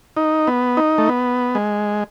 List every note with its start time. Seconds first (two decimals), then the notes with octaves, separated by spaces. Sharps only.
0.17 D#4
0.47 B3
0.77 D#4
0.98 A3
1.09 B3
1.55 G#3